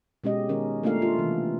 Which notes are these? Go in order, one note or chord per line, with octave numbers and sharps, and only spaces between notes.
B2 G#3 C#4 G4 D#5
D#3 C#4 A#4
A3 A#3 D4 F4 A#4 F5
F4
C3 E3